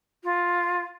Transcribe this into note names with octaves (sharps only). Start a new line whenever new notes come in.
F4